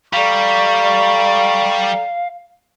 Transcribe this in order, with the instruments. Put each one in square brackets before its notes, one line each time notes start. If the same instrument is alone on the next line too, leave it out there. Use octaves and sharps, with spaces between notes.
[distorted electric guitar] G3 [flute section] A4 D5 A#5 [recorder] F5 [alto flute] C#6